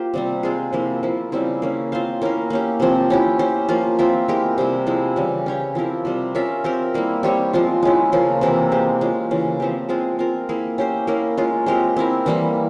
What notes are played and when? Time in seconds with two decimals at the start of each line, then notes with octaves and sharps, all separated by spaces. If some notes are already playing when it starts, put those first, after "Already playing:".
Already playing: A#3 F4 G4 C5
0.14 C3 G3 C4
0.43 G#3 C4 F4 G#4
0.73 C3 F3 A#3 E4
1.03 F3 A#3 E4
1.32 C#3 G3 C4 E4
1.62 A#3 C#4 E4
1.92 C4 F4 C5 F5
2.22 A#3 C#4 E4 A#4
2.50 A#3 C#4 G4
2.80 C3 F3 C4
3.10 C#4 E4 G4
3.39 C#4 G4 C5
3.69 F3 A#3 F4
3.99 C4 F4 A#4 E5
4.28 G#3 E4 G4 A#4
4.58 C3 G3 C4 E4
4.87 F3 G#3 E4 G#4
5.16 C#3 E3 G3
5.46 C#4 G4 C#5
5.75 F3 C4 E4 A#4
6.05 C3 G3 C4
6.35 C#4 F4 A#4 E5
6.64 C4 G4 A#4
6.94 G3 A#3 E4
7.23 G3 C4 G4 C#5
7.53 F3 G#3 C4 F4
7.83 G#3 C#4 E4
8.12 C#3 F3 A#3
8.41 C3 E3 A#3 E4
8.72 G#3 C4 G4
9.01 G#3 C#4 F4
9.31 C#3 E3 A#3
9.60 F3 C4 G4
9.89 G#3 C4 F4 G#4
10.19 C4 F4 A#4
10.49 A#3 E4 G#4
10.78 C#4 G4 C5
11.07 A#3 C#4 E4 A#4
11.37 G#3 C#4 F4
11.66 G#3 C4 G4 A#4
11.96 C4 E4 A#4
12.26 E3 G3 A#3 E4